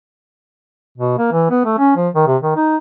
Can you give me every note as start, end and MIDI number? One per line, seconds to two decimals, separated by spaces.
0.98 1.17 47
1.18 1.28 58
1.32 1.46 52
1.51 1.60 59
1.65 1.75 57
1.79 1.95 61
1.97 2.09 53
2.15 2.26 51
2.27 2.37 48
2.43 2.56 51
2.56 2.76 63